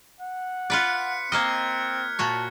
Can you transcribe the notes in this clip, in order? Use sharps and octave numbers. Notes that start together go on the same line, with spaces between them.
F#5
F4 B4 D5 F#6 B6 C#7
A#3 C4 C5 D#5 F6 G#6
A#2 F#4 C#5 A5